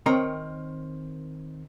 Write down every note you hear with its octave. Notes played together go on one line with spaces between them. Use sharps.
D#3 C4 A#4 C#5 A#5